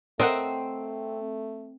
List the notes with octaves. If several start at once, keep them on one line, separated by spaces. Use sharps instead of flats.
A3 C4 A#4 D#5 E5 F#5